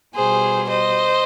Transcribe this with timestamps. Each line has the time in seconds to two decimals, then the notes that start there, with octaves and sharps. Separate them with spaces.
0.15 B2 G3 G#4 C5
0.69 C5 D#5